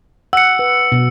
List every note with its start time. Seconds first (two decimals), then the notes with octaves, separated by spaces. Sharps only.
0.33 F#5 E6 C#7
0.59 B4
0.92 B2